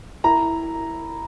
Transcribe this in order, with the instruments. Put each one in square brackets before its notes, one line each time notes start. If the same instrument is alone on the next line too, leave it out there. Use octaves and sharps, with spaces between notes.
[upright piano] E4 A#5